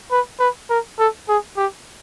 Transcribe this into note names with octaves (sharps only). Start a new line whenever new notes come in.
B4
B4
A#4
A4
G#4
G4